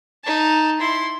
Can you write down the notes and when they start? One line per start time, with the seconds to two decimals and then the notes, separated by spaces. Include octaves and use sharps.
0.24 D#4 A5
0.80 E4 C6